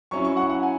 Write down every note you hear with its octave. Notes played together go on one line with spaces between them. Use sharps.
F#3 C#4 E4 C#6
C#6
F#5
F#5
G#5